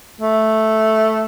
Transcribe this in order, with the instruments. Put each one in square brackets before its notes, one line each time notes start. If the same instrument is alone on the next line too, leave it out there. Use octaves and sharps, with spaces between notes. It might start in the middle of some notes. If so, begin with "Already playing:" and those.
[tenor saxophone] A3